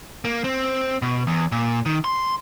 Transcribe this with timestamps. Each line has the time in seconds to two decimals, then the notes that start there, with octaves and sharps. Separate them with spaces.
0.25 A#3
0.44 C4
1.02 B2
1.27 E2
1.52 A#2
1.86 D#3
2.04 C6